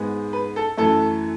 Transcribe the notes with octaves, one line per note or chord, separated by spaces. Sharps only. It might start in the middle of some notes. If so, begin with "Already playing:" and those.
Already playing: G#2 G#3 B3
B4
A4
F#2 E3 A3 A4